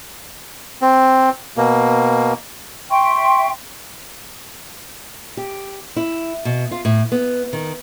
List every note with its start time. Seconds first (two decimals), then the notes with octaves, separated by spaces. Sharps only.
0.82 C4
1.57 B2 A#3
2.91 E5 G5 C6 C#6
5.37 G4
5.96 E4
6.45 B2
6.71 F4
6.85 A2
7.12 B3
7.53 D#3